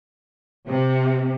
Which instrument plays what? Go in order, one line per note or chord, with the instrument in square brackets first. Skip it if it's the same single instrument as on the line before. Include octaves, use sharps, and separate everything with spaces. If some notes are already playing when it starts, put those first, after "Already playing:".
[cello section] C3